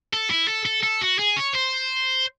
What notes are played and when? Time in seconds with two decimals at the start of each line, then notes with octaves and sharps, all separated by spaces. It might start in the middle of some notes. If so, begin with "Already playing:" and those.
0.13 A4
0.30 E4
0.48 A4
0.65 A4
0.83 A4
1.01 F#4
1.19 G#4
1.37 C#5
1.54 C5